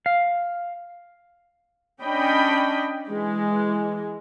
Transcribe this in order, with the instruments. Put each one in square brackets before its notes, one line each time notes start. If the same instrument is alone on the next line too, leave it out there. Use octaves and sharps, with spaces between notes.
[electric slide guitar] F5
[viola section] C#4 D4 D#5 G5 B5
E3 G#3